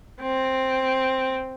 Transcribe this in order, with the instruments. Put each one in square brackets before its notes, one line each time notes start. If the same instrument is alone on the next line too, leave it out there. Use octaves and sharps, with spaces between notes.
[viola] C4